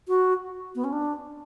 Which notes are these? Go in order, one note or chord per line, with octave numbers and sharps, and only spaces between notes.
F#4
B3
C#4
D4